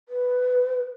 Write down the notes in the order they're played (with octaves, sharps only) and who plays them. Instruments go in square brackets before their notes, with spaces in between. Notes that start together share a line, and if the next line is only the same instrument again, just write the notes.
[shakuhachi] B4